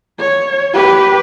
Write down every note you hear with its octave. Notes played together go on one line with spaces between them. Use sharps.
C#5
G4 B4